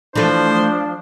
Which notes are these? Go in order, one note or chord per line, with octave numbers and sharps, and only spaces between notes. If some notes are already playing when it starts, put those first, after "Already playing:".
E3 F3 A3 D4 C5